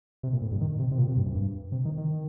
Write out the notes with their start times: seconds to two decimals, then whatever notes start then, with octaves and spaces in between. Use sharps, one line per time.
0.23 C3
0.33 A#2
0.42 A2
0.52 G2
0.61 D#3
0.79 C3
0.92 C3
0.98 A#2
1.08 C3
1.17 G2
1.26 F#2
1.35 G2
1.72 C3
1.85 D#3
1.98 D#3